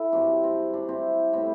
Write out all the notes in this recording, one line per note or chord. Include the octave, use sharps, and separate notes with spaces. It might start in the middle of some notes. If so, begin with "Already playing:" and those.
Already playing: E4 A4
G2 F#3 C4 D4
C4
D4
C4 E4
A2 G3 B3 C4 E4